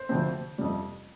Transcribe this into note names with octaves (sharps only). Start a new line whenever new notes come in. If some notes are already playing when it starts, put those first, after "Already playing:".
Already playing: C5
D2 C3 F3 C4
F2 C3 G3